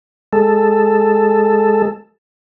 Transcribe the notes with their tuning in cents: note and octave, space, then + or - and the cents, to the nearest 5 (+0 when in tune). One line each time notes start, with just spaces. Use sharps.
G#3 +0 A4 +5